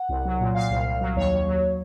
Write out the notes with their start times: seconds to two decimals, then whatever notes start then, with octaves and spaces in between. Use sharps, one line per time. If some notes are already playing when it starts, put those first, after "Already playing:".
Already playing: F#5
0.09 C2
0.25 F#3
0.40 A#2
0.55 A#2 F5
0.70 C2
0.86 C2
1.01 F#3
1.16 D#2 C#5
1.32 D#2
1.47 F#3